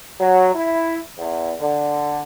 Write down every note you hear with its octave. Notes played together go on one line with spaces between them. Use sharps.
F#3
E4
E2
D3